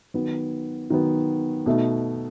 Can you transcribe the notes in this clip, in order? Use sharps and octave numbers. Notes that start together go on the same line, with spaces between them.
D#3 F#3 B3
D#3 F#3 B3
B2 A3 D#4